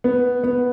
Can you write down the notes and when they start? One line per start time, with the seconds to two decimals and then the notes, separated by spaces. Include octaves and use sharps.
0.04 B3
0.44 B3